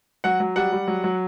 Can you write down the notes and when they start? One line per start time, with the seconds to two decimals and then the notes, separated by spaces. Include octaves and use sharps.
0.24 F#3 F#5
0.40 F#3
0.56 G3 F#5
0.72 G3
0.88 F#3
1.04 F#3